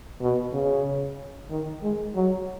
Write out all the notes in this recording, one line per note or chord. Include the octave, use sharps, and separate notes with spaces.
B2
C#3
D#3
G#3
F#3